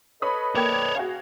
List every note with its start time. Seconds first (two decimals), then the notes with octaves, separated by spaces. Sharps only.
0.22 A4 B4 C#5 D#5 B5 D#6
0.55 A#3 C#5 D5 G5 G#6
0.95 F#4 G#4 F5